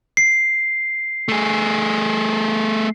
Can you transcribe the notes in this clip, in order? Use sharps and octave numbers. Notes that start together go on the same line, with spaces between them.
C7
A3 G#4